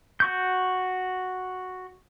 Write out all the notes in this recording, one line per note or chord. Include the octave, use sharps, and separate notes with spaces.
F#4 C#6 G6